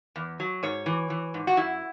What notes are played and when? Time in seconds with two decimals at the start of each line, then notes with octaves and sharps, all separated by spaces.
0.16 E2
0.40 F#3
0.63 G#2 C#5
0.86 E3
1.10 E3
1.34 G#2
1.47 F#4
1.57 F#2 E4